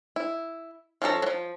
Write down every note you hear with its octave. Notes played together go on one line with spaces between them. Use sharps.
E4
F3 C#4 D4 A4 A#5
F3 F#3